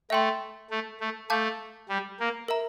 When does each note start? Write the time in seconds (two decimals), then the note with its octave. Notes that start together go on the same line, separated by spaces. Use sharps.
0.10 A3 E5 G5 C6
0.70 A3
1.00 A3
1.30 A3 F5 A5 D6 G6
1.89 G3
2.20 A#3
2.48 A#4 E5 A#5